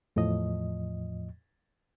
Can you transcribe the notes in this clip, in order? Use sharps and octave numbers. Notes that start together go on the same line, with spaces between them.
E2 A2 F3 D#5